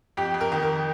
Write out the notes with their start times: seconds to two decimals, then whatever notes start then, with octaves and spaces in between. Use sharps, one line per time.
0.17 F2 G4
0.34 F2
0.41 A#4
0.52 D#3
0.63 A#4